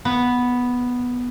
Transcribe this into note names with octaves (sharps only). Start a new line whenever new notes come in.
B3